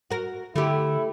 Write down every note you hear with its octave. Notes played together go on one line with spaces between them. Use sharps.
F#4 A#4
D3 A3 E4 G4